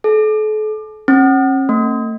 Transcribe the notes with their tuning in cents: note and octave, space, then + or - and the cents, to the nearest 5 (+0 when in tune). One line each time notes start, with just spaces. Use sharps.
A4 -40
C#4 -45
A3 +45